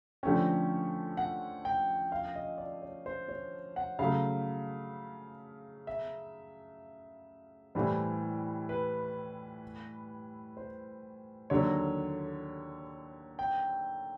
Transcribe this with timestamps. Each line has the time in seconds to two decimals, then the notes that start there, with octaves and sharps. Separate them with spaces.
0.23 D3 F3 A3 C#4 G5
1.17 F#5
1.65 G5
2.12 F5
2.35 D#5
2.58 D5
2.82 C#5
3.06 C5
3.28 C#5
3.76 F#5
3.99 C#3 F#3 A3 F5
5.87 E5
7.75 A2 E3 G3 C5
8.69 B4
10.57 C5
11.50 D#2 D3 F#3 C#5
13.39 G5